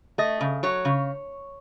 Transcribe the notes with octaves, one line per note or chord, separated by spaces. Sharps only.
A3 D#5
C#3
F#3 C#5
C#3